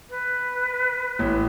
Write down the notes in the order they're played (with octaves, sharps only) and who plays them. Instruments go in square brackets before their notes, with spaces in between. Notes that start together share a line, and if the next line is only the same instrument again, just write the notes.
[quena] B4
[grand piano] A1